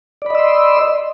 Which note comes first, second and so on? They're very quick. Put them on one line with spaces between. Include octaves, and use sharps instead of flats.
D5 B5 D#5 E6 C6